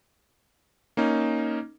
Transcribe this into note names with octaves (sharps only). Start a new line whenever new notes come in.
A#3 C#4 D#4